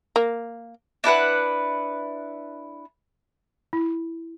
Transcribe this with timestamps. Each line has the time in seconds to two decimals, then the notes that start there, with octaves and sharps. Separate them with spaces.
0.16 A#3
1.04 D4 E4 B4 F#5
3.73 E4